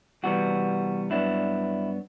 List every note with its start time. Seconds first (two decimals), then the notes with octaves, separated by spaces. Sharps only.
0.23 C2 C3 E3 G3 B3 F#4
1.10 G2 F#3 B3 D4 E4